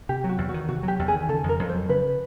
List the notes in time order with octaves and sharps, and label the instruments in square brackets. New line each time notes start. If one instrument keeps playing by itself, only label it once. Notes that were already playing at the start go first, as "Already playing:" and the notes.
[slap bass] C3 [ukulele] G4
[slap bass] F#3
[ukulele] F#4
[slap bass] E2
[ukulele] F#4
[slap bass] D#3
[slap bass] C3 [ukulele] F#4
[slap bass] F#3 [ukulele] G4
[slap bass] E2
[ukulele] G#4
[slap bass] D#3
[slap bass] C#3 [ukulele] A4
[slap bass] F2
[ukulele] A#4
[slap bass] F2
[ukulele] C5
[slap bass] F#3
[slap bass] C#3 [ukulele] B4